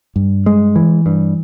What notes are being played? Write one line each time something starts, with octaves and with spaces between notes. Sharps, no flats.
G2
G#3
E3
G2